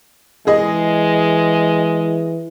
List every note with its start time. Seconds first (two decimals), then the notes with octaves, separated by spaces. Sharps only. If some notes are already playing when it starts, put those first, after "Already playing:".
0.47 E3 G#3 G#4 D#5